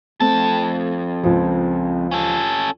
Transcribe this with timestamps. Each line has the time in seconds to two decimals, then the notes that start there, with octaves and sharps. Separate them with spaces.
0.20 F2 A3 C4 A5
1.23 C#2 F3
2.11 C#4 A4